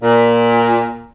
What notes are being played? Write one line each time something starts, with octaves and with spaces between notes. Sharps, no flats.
A#2